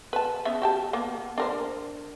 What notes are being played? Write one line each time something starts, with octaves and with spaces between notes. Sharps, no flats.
B4 A5
C#3 B3 E5
F#4 G4 A5
A#3 B3
D4 A#4 C5